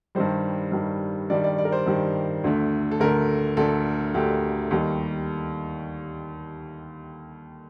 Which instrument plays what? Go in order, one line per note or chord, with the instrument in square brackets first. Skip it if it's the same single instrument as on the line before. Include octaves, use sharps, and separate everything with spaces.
[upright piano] G2 D#3 G3 C5
G2 D#3 G3
G2 D#3 G3 D5
D5
D5
A#4
C5
G2 D#3 G3
D2 D3 A3
A4
D2 D3 A3 A#4
D2 D3 A3 A4
D2 D3 A3 G4
D#2 D#3 G3